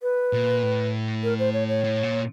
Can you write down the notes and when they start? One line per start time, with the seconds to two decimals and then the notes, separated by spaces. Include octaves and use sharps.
0.02 B4
0.33 A#2
0.63 A2
1.23 A#4
1.39 C5
1.53 C#5
1.68 C#5
1.84 A2
2.03 A#2